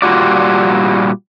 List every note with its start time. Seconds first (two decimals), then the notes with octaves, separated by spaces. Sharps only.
0.02 A#2 G3 F4 F#4 D5